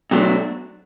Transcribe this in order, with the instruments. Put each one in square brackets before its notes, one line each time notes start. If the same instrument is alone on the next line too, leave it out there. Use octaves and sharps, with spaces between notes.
[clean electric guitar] B2 F#3 A3 D4